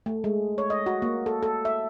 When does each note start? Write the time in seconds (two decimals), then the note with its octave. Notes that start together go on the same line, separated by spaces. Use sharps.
0.06 A3
0.24 G#3
0.58 C#5
0.70 D#5
0.86 F#4
1.02 A#3
1.26 A4
1.43 A4
1.65 E5